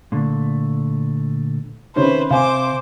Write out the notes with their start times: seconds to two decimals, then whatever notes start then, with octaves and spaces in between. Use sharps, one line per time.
0.12 A#2 D3 A3
1.96 C3 D#3 C#4 B4 C5
2.31 C3 C5 F5 G#5 D6